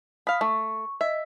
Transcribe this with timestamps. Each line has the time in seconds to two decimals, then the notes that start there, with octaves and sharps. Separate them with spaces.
0.27 F5 B5 D#6
0.41 A3 C#6
1.01 D#5 E5